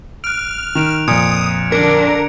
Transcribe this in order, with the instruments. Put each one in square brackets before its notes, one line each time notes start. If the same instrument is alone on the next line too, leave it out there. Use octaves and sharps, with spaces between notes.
[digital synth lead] F6 [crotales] F#6 D7
[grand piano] D#3 [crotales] D7 E7 F7
[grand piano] F2 A#2 [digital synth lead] D#6 [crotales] G#6 C#7 D7
[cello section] D3 D4 [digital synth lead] A#4